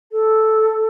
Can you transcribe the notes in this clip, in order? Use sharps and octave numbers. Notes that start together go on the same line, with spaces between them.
A4